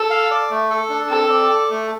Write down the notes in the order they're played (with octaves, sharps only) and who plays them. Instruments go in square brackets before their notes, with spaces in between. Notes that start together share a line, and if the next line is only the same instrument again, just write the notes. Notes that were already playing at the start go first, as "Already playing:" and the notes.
Already playing: [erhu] A4
[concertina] F5
D5
A3
A4
D4
[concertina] C4 [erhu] A4
[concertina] D5
A4
A3